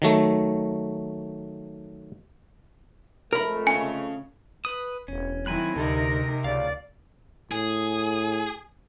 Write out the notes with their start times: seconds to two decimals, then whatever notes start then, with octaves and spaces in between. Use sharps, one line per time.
0.02 D#3 F#3 A3
3.33 F2 G#3 A3 A#4 B5
3.67 C#4 F5 G#5
4.65 B4 D#6
5.08 E1 C#4
5.46 D#3 F#3 C4 E4 G#5 B5 F#6
5.76 D2 C3 D#4 A#4
6.44 C#2 D5 F5
7.52 A2 G#4